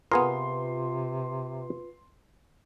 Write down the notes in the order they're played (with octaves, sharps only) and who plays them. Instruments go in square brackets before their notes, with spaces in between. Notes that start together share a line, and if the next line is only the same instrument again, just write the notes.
[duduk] C3 [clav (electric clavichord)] B3 G#4 A#4 [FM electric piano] F4 B4 [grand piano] C6